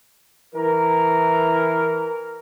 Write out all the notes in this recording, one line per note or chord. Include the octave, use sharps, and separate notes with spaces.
E3 A#4